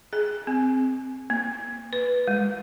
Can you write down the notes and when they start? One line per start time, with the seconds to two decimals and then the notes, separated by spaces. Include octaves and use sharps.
0.13 G#4
0.47 C4
1.30 A#3
1.93 B4
2.27 G#3